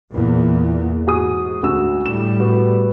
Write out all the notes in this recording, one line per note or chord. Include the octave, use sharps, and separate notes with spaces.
E2 A#2
G#2 F#4 G#4 D#6
D2 F#4 E6
A2 G3 E7
B3 F#4